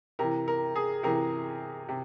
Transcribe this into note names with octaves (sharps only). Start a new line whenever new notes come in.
C3 E3 A#4
A#4
G#4
C3 E3 A#4
C3